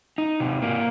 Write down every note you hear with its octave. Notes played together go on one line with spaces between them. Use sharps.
D#4
C3
A#3